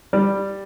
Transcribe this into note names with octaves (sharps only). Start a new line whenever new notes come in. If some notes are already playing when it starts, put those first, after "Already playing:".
G3